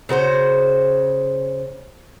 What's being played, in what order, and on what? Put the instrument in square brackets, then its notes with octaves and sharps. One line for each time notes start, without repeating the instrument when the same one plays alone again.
[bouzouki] C#3 F#4 B4 C5